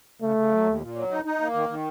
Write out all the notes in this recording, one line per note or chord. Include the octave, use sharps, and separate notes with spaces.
C#3 A3
C#3
F#3
D#2
A#2
F#3
D#4
D#4
A#3
D#3
D#3